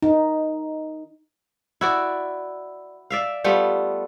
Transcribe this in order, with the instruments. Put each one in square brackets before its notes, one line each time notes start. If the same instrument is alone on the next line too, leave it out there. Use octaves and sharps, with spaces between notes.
[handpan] D#4
[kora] E4 F#4 D5
D5 E5 F5
G3 A3 B3 F4